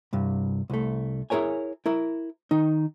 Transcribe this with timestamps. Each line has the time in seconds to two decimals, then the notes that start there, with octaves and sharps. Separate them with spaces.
0.13 C2 G2
0.70 C2 A3
1.30 E4 G#4 A#4 C#5 G#5
1.86 E4 A#4
2.51 D#3 D#4